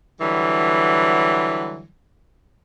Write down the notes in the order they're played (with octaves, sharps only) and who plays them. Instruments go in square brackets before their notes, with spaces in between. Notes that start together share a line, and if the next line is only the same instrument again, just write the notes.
[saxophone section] D3 E3 F#3 G3